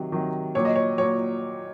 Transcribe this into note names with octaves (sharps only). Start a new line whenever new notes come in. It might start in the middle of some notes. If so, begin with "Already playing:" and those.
Already playing: C3 D#3 F#3
C3 D#3 F#3
A#2 F#3 C#5
D#5
C#5
A#2 F#3 C#5